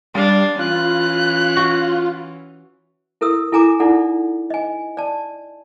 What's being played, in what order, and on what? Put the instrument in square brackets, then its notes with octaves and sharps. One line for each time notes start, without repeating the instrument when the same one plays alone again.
[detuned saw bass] G3 [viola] D4 [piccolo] F5
[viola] E3 C#4 [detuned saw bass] F4 [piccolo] F#6
[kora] F#4
[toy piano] E4 A4 A#4 D#6 E6
E4 A4 G#5 A#5 D6
D#4 E4 A4 D5 F#5
D#5 G#5
D5 A5